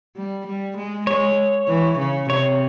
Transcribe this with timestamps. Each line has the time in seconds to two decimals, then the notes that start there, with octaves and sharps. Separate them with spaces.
0.16 G3
0.47 G3
0.77 G#3
1.07 G#3 C#5
1.68 E3
1.99 C#3
2.29 C3 C#5